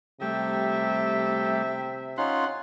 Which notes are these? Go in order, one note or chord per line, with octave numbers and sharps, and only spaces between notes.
C3 G3 A3 E5 G5
C#4 D#4 F4 F#5 C6